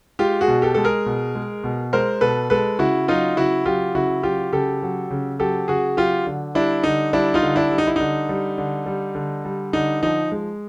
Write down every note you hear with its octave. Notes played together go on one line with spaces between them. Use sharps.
G#3 F4 G4
F#4 G#4
B2
G4 A4
G#3 A4
G#4 A#4
B2
G#3
B2
G#3 A#4 C5
B2 A4 B4
G#3 A4 B4
C#3 E4 F#4
F#3 D#4 F4
C#3 E4 F#4
F#3 F4 G4
C#3 E4 F#4
F#3 F4 G4
C#3 G4 A4
F#3
C#3
F#3 G4 A4
C#3 F#4 G#4
F#3 F4 G4
D3
G3 D4 E4
D3 D#4
G3 D4 E4
D#4 F4
D3
D4 E4
G3
D#4
E4
D3 D#4
G3
D3
G3
D3
G3
D3 D#4
F3 D#4
G#3